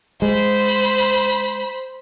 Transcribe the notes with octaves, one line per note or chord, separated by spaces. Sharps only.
G#3 C5 B5